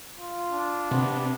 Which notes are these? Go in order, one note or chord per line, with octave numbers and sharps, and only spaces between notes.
F4
D4
C3 B3